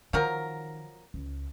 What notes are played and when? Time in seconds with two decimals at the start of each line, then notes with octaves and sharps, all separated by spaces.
0.13 D#3 F3 F#3 A#4
1.14 C#2